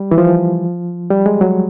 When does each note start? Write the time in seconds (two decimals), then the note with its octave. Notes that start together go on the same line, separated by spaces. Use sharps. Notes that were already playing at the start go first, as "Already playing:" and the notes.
Already playing: G3
0.11 E3
0.18 F3
1.10 G3
1.26 G#3
1.41 F#3